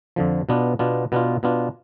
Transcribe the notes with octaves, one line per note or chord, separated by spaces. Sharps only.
F2 D3 F3
B2 B3 D4 F4
B2 B3 D4 F4
B2 B3 D4 F4
B2 B3 D4 F4